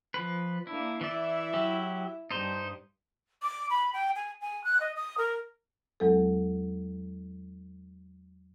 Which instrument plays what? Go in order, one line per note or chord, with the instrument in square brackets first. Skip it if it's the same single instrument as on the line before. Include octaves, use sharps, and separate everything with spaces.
[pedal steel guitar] F3 B4
[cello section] A#3 D4 [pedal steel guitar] E4
[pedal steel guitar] E3 D5 [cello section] E4 E5
[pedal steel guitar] F#3 G4
[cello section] G2 [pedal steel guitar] D#4 C5
[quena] D6
B5
G5
G#5
G#5
F#6
D#5
D#6
A#4
[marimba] E2 F#3 G#3 C4 A4